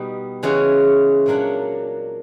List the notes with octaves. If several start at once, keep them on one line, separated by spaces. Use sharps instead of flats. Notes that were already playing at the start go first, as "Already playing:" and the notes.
Already playing: B2 G3 B3 D#4
C#3 E3 G#3 C#4 F#4
A#2 F#3 A#3 D4